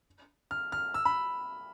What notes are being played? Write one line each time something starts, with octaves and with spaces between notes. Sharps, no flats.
F6
F6
E6
B5